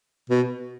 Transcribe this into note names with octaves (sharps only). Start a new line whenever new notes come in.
B2